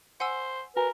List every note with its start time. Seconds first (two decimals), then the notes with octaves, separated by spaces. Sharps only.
0.20 C5 F#5 G#5 E6
0.76 F#4 A#4 B4 G#5 A#5